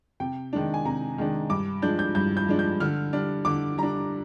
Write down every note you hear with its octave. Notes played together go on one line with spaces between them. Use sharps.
C3 G5
D#3 G#3 D4
G#5
C3 A#5
D#3 G#3 D4
G2 D6
F3 G#3 D4 G6
G6
G2 G6
G6
F3 G#3 D4
G6
D3 F6
G3 D4
D3 D6
G3 D4 A#5